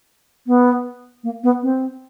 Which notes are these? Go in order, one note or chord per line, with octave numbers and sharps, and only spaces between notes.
B3
A#3
B3
C4